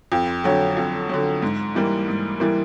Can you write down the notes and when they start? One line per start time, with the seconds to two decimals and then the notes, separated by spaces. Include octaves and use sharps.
0.12 F2
0.44 D3 F#3
0.77 F2
1.09 D3 F#3
1.42 G#2
1.75 E3 G3 A#3
2.08 G#2
2.40 E3 G3 A#3